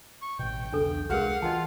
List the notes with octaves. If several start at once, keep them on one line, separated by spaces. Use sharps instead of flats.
C#6
A1 B2 G5
B1 E2 C#3 D4 A4
C2 G#3 F#4 G#4 A#4 F5 F#5
E3 F4 D#5 G5 A5